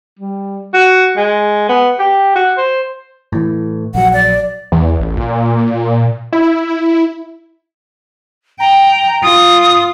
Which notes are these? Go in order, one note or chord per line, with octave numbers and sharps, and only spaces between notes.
G3
F#4
G#3
B3
G4
F#4
C5
A2 E3
A#1 F#3 F#5
D5
E2
A1
A#2
E4
G5 A#5
F4 D#6